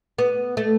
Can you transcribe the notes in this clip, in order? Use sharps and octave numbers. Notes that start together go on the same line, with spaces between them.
B3
A3